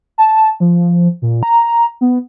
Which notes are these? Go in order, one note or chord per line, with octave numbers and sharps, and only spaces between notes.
A5
F3
A#2
A#5
B3